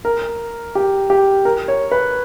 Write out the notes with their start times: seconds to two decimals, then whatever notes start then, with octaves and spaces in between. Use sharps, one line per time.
0.05 A#4
0.75 G4
1.10 G4
1.45 A#4
1.68 C#5
1.91 B4